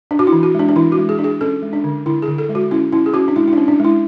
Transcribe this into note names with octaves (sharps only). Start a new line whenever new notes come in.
D4
F#4
E4
E3
F#4
G#3 D4
D4
E3 E4
F#4
G#3
G#4
D4
G#4
C#4 A4
G#3
D4
D3
D3 E4
G#4
D3
A4
G#3
F#4
C#4 E4
C#4 E4
G#4
C#4 F#4
D4
G#3 E4
E4
C#4 D4
D4
G#3 E4